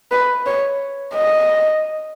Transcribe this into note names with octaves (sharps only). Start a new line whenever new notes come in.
B4
C#5
D#5